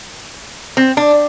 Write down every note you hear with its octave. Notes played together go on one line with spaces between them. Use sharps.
C4
D4